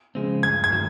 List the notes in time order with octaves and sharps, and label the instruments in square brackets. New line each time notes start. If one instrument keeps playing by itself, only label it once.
[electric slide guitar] C#3 F3 G#3 C4
[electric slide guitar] G2 [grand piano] G#6
[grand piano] G#6
[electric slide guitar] D#3 F#3 A3